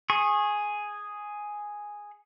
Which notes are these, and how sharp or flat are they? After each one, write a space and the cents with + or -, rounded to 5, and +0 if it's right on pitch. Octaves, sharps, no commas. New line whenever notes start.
G#4 +0 C#6 -25